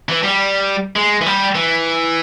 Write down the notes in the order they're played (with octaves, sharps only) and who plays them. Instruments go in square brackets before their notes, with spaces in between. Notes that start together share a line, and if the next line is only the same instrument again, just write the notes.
[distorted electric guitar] E3
G3
G#3
E3
G3
E3